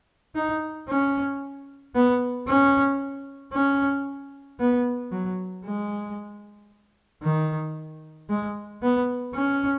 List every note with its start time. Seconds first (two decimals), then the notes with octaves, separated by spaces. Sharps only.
0.36 D#4
0.89 C#4
1.95 B3
2.48 C#4
3.53 C#4
4.59 B3
5.12 F#3
5.65 G#3
7.23 D#3
8.29 G#3
8.82 B3
9.35 C#4